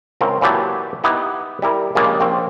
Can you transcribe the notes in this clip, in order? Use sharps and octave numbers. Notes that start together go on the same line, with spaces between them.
C#2 C#3 C4 A#4
A#2 E3 F#3 G4 A5
B3 D#4 E4 G4
G3 E4 A#4
A#1 C#3 G3 G#3 A#3 D5
A#1 C4 C#4 G5